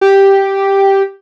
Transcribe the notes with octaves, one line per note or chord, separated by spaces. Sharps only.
G4